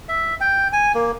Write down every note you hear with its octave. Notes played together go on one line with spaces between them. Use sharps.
E5
G5
G#5
A#3